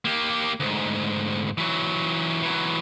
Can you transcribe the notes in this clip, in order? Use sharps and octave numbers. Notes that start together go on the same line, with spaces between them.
A#3 G4
D2 G#2
E3 F#3
E3 F#3